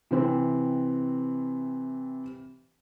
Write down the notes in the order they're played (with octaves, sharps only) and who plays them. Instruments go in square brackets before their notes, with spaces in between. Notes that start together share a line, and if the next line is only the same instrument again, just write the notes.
[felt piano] C3 E3 C4